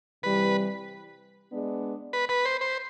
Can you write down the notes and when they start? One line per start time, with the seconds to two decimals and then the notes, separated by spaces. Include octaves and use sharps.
0.23 C3 E3 G3 B4
1.51 G#3 B3 D4
2.13 B4
2.29 B4
2.45 C5
2.61 C5